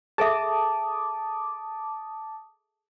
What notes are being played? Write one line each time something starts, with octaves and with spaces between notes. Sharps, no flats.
G#4 A4 E5 A5 D6 D#6